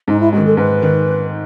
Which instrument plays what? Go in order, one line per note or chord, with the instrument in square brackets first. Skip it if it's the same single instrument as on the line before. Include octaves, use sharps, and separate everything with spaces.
[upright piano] G#2 [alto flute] D#4
[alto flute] E4
[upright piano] D#3 G#3 [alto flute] F#4
[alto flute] A4
[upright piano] G#2 [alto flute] B4
[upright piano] D#3